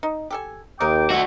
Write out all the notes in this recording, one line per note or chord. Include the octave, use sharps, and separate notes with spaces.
D#4
G4 A4 G#5
D#2 D#4 A#4 G5 D6
B2 A3 F#4 E5